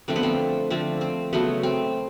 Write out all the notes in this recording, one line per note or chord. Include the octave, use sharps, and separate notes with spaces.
D3 F3 A3 C4
B3
C4
D3 F3 A3 C4
C4
C#3 F#3 A3 B3
C4